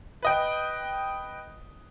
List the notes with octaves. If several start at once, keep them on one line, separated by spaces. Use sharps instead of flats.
B4 D#5 G5